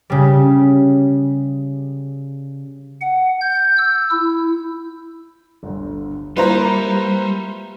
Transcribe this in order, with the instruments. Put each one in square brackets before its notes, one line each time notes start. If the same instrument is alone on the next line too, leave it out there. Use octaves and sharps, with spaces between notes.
[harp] C#3 G3
[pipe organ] F#5
G6
E6
E4
[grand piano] G1 D2
[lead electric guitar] G3 [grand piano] A#3 E4 F4 [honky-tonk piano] B4 C5 A#5